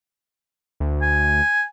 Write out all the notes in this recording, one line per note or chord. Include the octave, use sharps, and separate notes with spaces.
D2
G#5